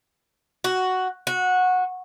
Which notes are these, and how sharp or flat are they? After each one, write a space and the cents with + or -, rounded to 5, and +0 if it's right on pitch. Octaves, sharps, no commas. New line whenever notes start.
F#4 +5
F#4 -15